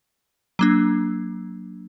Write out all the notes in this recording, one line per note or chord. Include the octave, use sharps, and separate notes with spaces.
F#3 A#3 D4